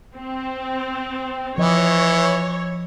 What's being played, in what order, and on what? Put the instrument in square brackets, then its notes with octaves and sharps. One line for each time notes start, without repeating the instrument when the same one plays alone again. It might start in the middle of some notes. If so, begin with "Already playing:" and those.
[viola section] C4
[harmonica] E3 [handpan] F3 D#5 [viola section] C#5